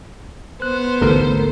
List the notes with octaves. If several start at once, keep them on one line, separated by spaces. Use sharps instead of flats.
B3 C5 F#6
A1 D2 G#2 C3 A4 A#4